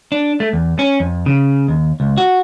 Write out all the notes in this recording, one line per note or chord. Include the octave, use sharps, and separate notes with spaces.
D4
A3
E2
C#4
F2
C#3
D#2
C#2
F#4